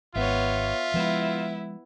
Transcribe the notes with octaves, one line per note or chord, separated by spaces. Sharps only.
G#1 B3 F4 C#5 E5
F3 G#3 B3 E4